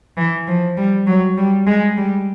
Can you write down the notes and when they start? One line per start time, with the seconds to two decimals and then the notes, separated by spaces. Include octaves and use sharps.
0.17 E3
0.47 F3
0.77 G3
1.07 F#3
1.37 G3
1.67 G#3
1.97 G3